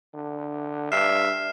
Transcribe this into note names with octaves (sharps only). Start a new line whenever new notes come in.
D3
G2 E5 F6 C7 E7